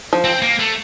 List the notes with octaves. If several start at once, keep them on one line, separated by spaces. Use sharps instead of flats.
F3
C4
A#3
A3